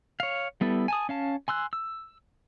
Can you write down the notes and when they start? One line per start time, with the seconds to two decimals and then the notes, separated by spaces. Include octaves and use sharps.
0.20 C#5 F5
0.61 G3 B3 E4 A4
0.88 G#5 A5 D#6
1.09 C#4 F5 A5
1.48 G#5 C6 E6 F#6
1.73 E6